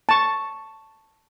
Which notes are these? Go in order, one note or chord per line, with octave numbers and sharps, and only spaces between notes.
A5 C#6